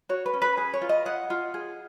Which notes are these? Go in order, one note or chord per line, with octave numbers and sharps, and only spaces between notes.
F#4 C#5
B4
C#4
B4
G#4
C#5
F4
D#5
G#4 F#5
F4
G#4